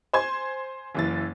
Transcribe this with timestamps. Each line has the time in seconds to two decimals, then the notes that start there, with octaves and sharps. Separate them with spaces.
0.14 C5 G#5 C6 G#6
0.95 F#1 E3 A6